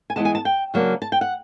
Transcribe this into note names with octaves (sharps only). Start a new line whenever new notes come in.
G#5
E3 G#3 B3 A5
G#5
A5
G5
C#3 F#3 A#3 D4
A5
G5
F#5